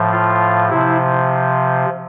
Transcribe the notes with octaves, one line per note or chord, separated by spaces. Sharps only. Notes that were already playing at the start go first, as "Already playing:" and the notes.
Already playing: A2 F3
F4
C3 F3 E4